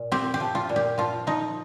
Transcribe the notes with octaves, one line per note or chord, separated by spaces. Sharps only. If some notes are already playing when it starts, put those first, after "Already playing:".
Already playing: A#2
C4 G4
G4
F3
F4
A#2
G4
F3 F4
F3 D#4